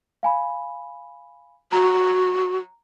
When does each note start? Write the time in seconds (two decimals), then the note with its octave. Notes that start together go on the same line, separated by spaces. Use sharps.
0.23 F5 G#5 B5
1.72 F#4 A#5